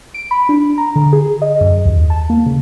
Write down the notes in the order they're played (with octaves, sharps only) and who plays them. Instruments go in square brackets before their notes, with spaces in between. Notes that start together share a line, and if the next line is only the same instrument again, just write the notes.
[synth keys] D7
B5
D4
A#5
D3
G#4
D#5
F#2
D#2
A5
A#3
C#3